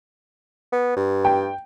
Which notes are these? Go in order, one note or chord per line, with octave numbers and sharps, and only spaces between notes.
B3
G2
G5